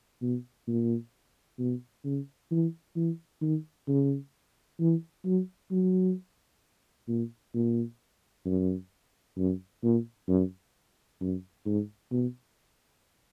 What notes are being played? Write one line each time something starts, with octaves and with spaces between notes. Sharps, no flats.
B2
A#2
B2
C#3
E3
E3
D#3
C#3
E3
F#3
F#3
A#2
A#2
F#2
F#2
A#2
F#2
F#2
G#2
B2